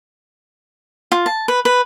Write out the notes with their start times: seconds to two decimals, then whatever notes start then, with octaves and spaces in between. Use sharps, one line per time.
1.12 F4
1.26 A5
1.48 B4
1.65 B4